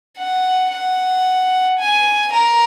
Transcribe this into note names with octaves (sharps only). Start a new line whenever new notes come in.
F#5
F#5
G#5
A#4